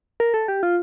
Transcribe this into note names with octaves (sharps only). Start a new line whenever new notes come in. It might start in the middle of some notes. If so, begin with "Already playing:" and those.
A#4
A4
G4
F4